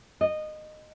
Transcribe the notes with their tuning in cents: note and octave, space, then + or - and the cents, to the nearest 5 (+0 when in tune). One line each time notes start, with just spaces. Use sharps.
D#5 -15